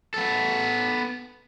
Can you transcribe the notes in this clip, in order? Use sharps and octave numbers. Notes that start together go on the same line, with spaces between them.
B3 A4